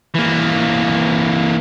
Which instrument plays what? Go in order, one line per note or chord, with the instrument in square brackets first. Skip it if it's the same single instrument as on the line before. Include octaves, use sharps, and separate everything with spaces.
[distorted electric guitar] E3 A#3